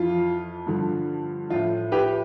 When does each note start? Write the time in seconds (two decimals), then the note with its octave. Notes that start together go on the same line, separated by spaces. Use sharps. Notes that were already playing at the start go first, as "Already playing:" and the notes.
Already playing: F2 E3 F4
0.67 G2 D3 F3
1.50 A2 F3 F4
1.92 G4 B4